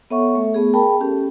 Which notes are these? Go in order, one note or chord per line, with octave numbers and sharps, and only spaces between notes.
B3 A4 C#5 E5 F#5 C#6
A3 A4 E5
A3 B3 G#4
G#4 A#4 G5 A5 B5
C#4 G4 A4